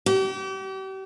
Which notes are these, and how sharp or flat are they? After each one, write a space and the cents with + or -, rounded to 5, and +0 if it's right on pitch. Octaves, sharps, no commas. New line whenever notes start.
G4 -40